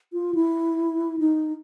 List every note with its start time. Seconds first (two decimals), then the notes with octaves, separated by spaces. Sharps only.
0.13 F4
0.35 E4
1.19 D#4